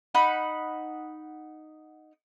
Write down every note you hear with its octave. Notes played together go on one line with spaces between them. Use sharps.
D#4 F#5 B5 F#6